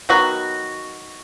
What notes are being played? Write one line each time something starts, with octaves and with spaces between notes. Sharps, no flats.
D#3 F#3 B3 F#4